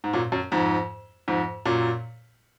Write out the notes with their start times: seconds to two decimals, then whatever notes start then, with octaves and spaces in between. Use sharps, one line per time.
0.04 G#2
0.13 F#2 A#2
0.32 F#2
0.52 F2 G#2
1.28 F2 G#2
1.66 F#2 A#2